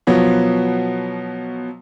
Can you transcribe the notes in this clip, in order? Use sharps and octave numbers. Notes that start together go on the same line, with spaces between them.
B2 F3 F#3 B3